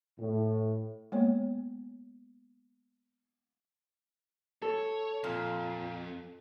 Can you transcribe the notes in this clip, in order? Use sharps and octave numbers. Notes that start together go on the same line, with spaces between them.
A2
G#3 A#3 B3 C#5
A4 C#5
F2 A#2